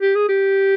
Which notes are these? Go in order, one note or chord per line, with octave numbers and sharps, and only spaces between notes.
G4
G#4
G4